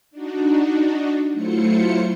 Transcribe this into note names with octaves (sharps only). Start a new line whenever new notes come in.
D4 D#4 F#4
F#3 A3 E4 F4 C5 C#7